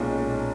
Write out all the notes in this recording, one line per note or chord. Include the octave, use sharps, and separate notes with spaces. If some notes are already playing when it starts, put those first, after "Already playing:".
Already playing: B1 A#2 G#3 C#4